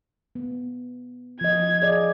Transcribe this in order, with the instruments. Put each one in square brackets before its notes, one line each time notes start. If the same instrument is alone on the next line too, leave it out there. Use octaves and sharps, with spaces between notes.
[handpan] B3
[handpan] F3 D#5 [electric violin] G#6
[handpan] G#4 D5 D#5